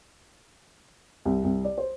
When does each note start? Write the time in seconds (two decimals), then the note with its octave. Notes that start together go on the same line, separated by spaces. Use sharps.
1.25 C2
1.44 C2
1.65 D5
1.78 C5